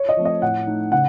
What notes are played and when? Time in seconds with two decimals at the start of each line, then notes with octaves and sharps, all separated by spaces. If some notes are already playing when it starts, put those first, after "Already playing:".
Already playing: C#5
0.09 D#5
0.17 F3 A3 C4
0.25 D#5
0.42 A2 F#5
0.67 A3 D#4
0.92 C#3 F#5